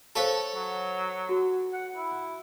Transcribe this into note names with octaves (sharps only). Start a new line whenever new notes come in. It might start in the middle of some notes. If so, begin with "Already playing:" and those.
A4 C5 C#5 E5 F5 A5
F#3
F#4
F#5
E4